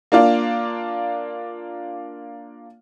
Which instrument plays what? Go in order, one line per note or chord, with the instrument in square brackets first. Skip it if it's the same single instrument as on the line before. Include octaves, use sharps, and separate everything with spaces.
[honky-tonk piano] A#3 D4 F4